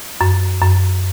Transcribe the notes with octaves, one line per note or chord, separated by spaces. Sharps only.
F#2
F#2